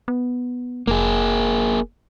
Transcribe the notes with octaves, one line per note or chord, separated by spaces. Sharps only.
B3
F1 A#3 G#4